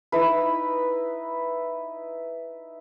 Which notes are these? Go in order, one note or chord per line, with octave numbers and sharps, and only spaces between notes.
D#4 E4 B4